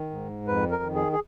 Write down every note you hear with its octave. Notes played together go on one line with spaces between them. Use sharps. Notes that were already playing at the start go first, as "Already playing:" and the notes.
Already playing: D#3
G#2
F2 B4
A#4
D#3
G#4
G#4